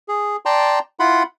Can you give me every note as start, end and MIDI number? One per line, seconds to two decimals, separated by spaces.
0.08 0.36 68
0.46 0.79 74
0.46 0.79 79
0.46 0.79 81
0.46 0.79 82
0.46 0.79 84
1.00 1.23 64
1.00 1.23 65
1.00 1.23 78
1.00 1.23 83
1.00 1.23 84